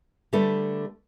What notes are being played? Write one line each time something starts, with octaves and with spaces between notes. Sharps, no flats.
D3 G3 A3 A4 B4